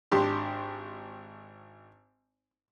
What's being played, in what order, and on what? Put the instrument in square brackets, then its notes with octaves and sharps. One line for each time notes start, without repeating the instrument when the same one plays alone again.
[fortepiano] G#1 D4 G4 C6